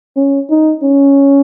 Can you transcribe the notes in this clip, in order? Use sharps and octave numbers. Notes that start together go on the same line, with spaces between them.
C#4
D#4
C#4